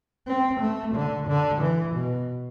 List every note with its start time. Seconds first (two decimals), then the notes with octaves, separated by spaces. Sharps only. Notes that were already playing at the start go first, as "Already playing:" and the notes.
0.27 C4
0.60 A3
0.95 D3
1.27 D3
1.61 E3
1.95 B2